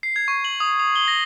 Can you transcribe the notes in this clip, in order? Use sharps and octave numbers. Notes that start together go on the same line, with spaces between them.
C7
G#6
C#6
F#7
D#6
D#6
G7
A#6